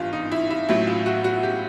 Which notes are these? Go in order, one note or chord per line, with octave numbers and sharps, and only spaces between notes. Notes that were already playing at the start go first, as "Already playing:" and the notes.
Already playing: G#1 G2 E3 F4
D#4
E4
E4
A1 A2 F#3 E4
F4
F#4
F#4
G4